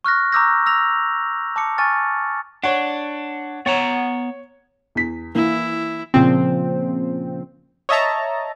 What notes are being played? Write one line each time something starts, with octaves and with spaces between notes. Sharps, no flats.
C#6 F6 F#6 A#6
A#5 C#6 D6 E6 G6 A#6
E6 A#6 F7
A5 D6 C#7
G#5 C#6 F6 A6
D4 C#5 F#5
B3 C#5 F#5 A#5
E2 B6
E3 A#3 E4
A#2 C#3 F3 C4
C#5 D#5 E5 A5 A#5